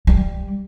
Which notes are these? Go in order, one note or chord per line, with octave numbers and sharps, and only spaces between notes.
G3